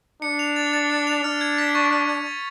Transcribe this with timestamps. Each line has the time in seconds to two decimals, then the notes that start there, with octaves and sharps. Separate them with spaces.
0.22 D4 C#7
0.39 F7
0.56 A6
0.73 A6
0.90 C#7
1.07 F7
1.24 D4 F6
1.41 G#6
1.58 B6
1.75 C#6
1.92 F6
2.09 G#6
2.26 A6